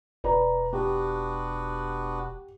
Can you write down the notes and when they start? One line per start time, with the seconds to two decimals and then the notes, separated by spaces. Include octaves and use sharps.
0.24 E1 B4 D5 A#5
0.73 B3 D4 F#4 G4